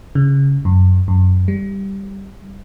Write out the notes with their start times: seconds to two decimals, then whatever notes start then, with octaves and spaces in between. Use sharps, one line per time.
0.15 C#3
0.65 F#2
1.08 F#2
1.48 G3